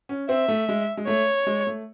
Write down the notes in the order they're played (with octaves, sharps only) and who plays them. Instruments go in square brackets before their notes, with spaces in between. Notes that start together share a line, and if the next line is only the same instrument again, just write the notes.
[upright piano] C#4
[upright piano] C4 [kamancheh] E5
[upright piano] A3
G#3
G#3
[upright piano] A3 [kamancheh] C#5
[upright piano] G#3
A3